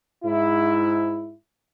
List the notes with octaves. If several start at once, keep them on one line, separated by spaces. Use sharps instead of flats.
G#2 E4